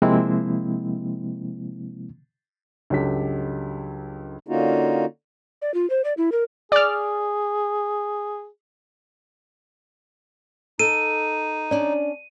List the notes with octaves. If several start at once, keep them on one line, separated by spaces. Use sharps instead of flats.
C3 F3 G#3 A#3 C4 E4
C#2 G2 F#3 G4 A4 B6
D3 A#3 C#4 D#4 F4 F#4
D5
F4
C5
D5
E4
A#4
G#4 D5 F6
D#4 A4 D#7
C#4 D4 D5